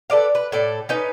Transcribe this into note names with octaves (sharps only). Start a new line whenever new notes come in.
A4 B4 D5 F5
B4
A2 A4 D5
C#4 D#4 B4